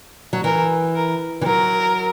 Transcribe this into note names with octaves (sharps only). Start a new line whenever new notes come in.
F#3
E3 A#4
A#4
E3
F#3 A#4